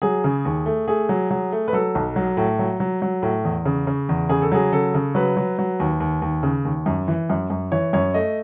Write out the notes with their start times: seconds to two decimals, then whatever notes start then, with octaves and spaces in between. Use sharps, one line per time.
0.02 F#3 G#4
0.24 C#3
0.45 D#2
0.66 A3
0.88 A3 G#4
1.09 F#3
1.31 F#3
1.52 A3
1.68 B4
1.73 F#3 A4
1.95 B1
2.16 F#3
2.37 A2
2.59 F#3
2.80 F#3
3.02 F#3
3.23 A2
3.44 E2
3.65 C#3
3.87 C#3
4.09 E2
4.29 C#3 G#4
4.42 A4
4.52 F#3 G#4
4.72 C#3 A4
4.94 C#3
5.15 F#3 B4
5.37 F#3
5.59 F#3
5.80 D#2
6.00 D#2
6.22 D#2
6.43 C#3
6.65 D#2
6.86 F#2
7.08 E3
7.30 F#2
7.50 F#2
7.72 E3 C#5
7.93 F#2 C#5
8.14 A3 D#5